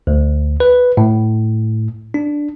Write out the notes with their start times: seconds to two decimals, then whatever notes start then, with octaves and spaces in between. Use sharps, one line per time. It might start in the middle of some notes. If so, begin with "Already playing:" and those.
0.07 D2
0.60 B4
0.97 A2
2.14 D4